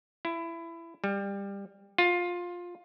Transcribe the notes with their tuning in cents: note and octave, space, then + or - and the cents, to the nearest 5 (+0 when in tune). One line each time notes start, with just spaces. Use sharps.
E4 +20
G3 +20
F4 +15